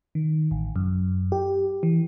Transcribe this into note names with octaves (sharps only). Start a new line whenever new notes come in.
D#3
A1
F#2
G4
E3